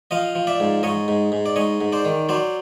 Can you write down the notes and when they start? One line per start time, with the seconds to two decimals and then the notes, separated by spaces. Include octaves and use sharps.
0.11 F3 D#5 F5
0.35 F3
0.47 D5 E5
0.60 G#2
0.83 G#2 C#5 D#5
1.08 G#2
1.32 G#2
1.46 D5
1.56 G#2 C#5 D#5
1.81 G#2
1.92 C5 D5
2.05 D#3
2.29 F#3 C5 D5